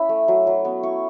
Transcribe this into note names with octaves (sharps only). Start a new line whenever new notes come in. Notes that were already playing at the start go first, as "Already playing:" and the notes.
Already playing: C#4 E4 B5
A3
F#3
F#3
B3
E4 C#6